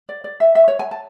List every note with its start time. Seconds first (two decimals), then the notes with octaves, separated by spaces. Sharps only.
0.09 D5
0.24 D5
0.40 E5
0.55 E5
0.68 C#5
0.79 G#5
0.91 A5